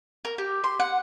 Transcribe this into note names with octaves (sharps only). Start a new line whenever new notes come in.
A#4
G4
C6
F#5